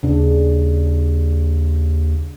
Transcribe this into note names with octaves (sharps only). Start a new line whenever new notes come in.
D#2 C#3 D4